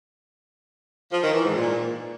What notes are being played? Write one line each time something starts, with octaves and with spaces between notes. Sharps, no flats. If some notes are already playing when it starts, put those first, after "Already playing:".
F3
D#3
E3
G#2
A#2